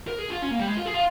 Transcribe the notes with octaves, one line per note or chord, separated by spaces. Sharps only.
A#4
G#4
F4
C#4
A#3
G3
G#3
F4
G#4
F4